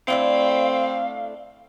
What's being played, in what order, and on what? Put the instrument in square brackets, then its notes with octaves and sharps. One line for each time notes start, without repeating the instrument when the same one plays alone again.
[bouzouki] A3 D4 E4 [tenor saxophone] C4 [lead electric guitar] F5